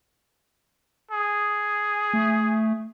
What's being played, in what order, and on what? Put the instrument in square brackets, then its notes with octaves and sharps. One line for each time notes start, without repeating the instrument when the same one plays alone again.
[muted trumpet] G#4
[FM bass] A3